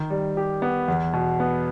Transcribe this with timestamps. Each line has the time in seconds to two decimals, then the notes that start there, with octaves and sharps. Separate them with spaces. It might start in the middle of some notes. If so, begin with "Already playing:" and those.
Already playing: D#3
0.10 G3
0.37 G4
0.62 B3
0.88 E2
1.13 B2
1.40 B3